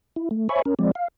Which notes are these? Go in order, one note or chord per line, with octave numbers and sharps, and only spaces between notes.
E4
A3
C5 C#5 E5 G#5 B5 C#6
C#4 A#4
F3 G#3 C4 D5
F5